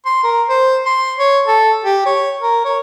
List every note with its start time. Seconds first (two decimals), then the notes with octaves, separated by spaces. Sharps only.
0.06 C6
0.24 A#4
0.49 C5
0.86 C6
1.18 C#5
1.47 A4
1.84 G4
2.06 C#5
2.41 A#4
2.65 C#5